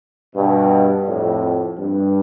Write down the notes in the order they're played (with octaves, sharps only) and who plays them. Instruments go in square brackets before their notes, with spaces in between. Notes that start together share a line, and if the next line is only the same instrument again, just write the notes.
[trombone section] G2 B2
F2 A2
G2